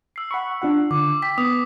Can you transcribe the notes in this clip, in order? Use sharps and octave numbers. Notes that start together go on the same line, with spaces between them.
E6 C7
F#5 B5 C#6
D4 F4 F#5
D3 D6
G5 B6
B3 D#6